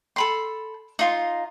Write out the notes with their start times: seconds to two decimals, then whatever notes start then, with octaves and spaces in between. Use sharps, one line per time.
0.16 A4 B5 C6
0.99 D#4 F4 C6